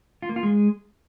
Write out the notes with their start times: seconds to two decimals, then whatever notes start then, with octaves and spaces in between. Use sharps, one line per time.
0.22 F4
0.29 A#3
0.36 F4
0.43 G#3